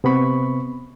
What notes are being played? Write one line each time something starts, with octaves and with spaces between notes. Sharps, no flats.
C3 B3 C4 B5 C#6